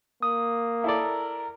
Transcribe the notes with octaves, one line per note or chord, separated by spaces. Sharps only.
A#3 D#6
E4 A4 A#4 D5